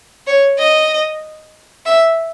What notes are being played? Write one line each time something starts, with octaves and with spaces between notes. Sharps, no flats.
C#5
D#5
E5